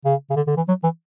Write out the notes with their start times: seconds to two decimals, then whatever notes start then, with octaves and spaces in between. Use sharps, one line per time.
0.05 C#3
0.30 C#3
0.36 D3
0.47 D3
0.57 E3
0.68 F#3
0.83 E3